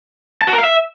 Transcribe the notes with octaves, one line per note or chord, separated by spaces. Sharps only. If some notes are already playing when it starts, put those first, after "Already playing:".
A5
F#4
A#4
F5
E5